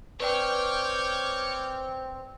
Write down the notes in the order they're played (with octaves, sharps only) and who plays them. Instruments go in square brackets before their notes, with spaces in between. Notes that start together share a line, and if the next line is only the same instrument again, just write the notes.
[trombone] C4 [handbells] B4 D5 G5 [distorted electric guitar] C#5 [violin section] D6 F6 G6